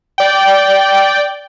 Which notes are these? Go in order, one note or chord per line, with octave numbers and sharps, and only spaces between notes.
D5 G5